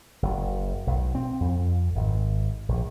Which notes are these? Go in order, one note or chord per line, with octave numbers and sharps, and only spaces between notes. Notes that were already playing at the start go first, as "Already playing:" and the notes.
F#1
B1
C4
F2
G#1
A#1